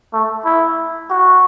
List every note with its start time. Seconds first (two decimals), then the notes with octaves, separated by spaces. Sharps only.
0.13 A3
0.45 E4
1.10 F#4